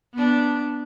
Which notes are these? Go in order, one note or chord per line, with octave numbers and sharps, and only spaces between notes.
B3 D4